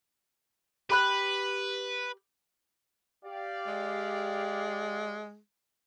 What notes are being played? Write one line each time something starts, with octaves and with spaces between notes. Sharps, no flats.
G4 B4 B5 F#6
G4 D5 F5
G#3